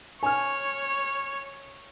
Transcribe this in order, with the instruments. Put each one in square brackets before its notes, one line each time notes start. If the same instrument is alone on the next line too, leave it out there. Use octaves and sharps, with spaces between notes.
[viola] C#5 [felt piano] G#5 F6